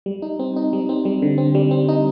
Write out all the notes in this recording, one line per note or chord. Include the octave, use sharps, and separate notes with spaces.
G3
D#4
C4
D#4
G3
C4
G3
D3
C4
G3
C4
D#4